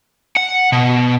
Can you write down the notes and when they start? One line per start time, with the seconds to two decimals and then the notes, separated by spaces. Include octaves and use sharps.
0.36 F#5
0.72 B2